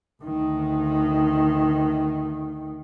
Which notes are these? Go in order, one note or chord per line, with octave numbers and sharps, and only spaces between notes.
D2 D#3